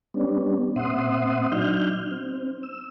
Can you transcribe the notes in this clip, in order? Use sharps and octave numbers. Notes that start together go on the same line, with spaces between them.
G3 B3 C#4 D4
A#2 C4 E5 F#5 C6 D#6
F#3 D4 D#4 F6 G6
C4
E6